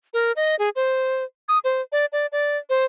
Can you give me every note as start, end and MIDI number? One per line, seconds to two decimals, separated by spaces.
0.14 0.32 70
0.36 0.55 75
0.59 0.69 68
0.76 1.24 72
1.49 1.59 87
1.64 1.81 72
1.92 2.05 74
2.13 2.26 74
2.32 2.57 74
2.70 2.85 72